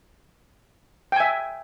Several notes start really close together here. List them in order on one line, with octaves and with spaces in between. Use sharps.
G5 G#5 E5